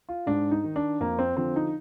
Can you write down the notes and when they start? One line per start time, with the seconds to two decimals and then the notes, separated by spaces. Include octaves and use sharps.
0.09 F4
0.26 G#2 D4
0.51 D#4
0.64 D#3
0.76 D4
1.00 F2 A#3
1.19 C4
1.37 D3 F3 C4
1.56 D#4